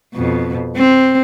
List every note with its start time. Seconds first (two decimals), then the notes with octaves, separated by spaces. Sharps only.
0.14 F2 B2
0.76 C4